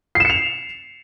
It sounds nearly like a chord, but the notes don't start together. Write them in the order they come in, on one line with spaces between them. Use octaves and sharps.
C7 E7 C#7 F7